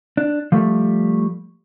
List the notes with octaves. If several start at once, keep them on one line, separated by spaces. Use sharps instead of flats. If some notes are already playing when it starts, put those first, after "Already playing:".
D4
F3 G3 A3